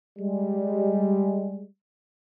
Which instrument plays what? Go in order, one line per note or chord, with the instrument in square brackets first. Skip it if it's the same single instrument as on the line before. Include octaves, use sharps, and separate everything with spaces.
[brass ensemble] G3 G#3